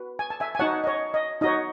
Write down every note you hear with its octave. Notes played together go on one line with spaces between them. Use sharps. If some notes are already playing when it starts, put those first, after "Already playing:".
Already playing: F#4 B4
G#5
A5
E5 G#5
G#5
D#4 F#4 C#5 F#5 A5
D#5
C#5
D#5
D#4 F#4 C#5 D#5